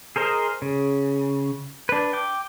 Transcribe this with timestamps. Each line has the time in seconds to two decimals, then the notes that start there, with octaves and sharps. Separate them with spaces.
0.16 G#4 A#4 C5 D#5
0.62 C#3
1.89 D4 B4
2.13 G5 D6